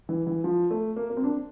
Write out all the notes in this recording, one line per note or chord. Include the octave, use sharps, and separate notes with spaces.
E3
E3
F3
A3
A#3
A#3
C4
D4